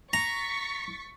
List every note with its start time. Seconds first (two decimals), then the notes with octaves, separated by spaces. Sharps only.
0.13 A#5 C#6 A6 B6